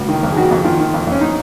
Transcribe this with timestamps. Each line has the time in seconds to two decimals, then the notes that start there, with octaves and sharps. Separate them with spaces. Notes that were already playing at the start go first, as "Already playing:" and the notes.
Already playing: C#2 F#4
0.08 D#3
0.23 F2
0.32 G#4
0.37 D#3 F#4
0.51 F2
0.64 D#3 F4
0.79 D#3
0.93 F2
1.07 F2 C#4
1.21 D#4